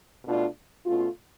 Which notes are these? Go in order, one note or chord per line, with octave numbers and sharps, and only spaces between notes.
B2 A3 D4 F4
B2 A3 C#4 F4